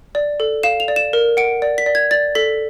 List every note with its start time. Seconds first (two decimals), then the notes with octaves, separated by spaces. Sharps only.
0.15 D5
0.40 A4
0.63 F5 E7
0.80 F7
0.88 D5
0.96 E7
1.13 A#4
1.37 F#5 D7
1.62 D5
1.78 B6
1.86 D5
1.95 G#6
2.11 D5 A6
2.35 A4 B6